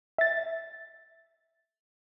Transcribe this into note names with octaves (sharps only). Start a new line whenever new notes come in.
E5 A6